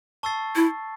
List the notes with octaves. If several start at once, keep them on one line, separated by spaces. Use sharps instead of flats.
A5 C#6 E6 A6 C7
E4